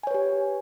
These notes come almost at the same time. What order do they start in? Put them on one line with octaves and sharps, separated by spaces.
G#5 C#5 B4 G4